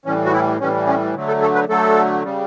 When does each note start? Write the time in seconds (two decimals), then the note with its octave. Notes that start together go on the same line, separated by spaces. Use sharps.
0.05 A2 E3 G3 C#4
0.25 F#4
0.32 E4
0.60 A2 E3 G3 C#4
0.87 C#4
1.15 D3 F#3 A3
1.28 A4
1.42 A4
1.55 B4
1.69 D3 F#3 A3 A4
2.23 C#3 G3